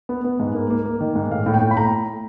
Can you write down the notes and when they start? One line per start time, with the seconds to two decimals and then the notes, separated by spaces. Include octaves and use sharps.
0.09 B3
0.24 B3
0.40 G#2
0.54 A#3
0.70 A#3
0.86 A#3
1.01 D#3
1.16 G#2
1.31 A2 F5
1.46 A2
1.54 G5
1.62 A2
1.71 B5
1.77 A2 A#5